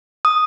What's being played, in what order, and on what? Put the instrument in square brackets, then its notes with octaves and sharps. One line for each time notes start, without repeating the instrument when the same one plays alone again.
[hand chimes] D#6